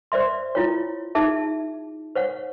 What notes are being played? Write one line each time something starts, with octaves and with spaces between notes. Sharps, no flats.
C5 D5 E5 C6
E4 F4 C#5
D#4 G#4 E5 A5
C5 C#5 F#5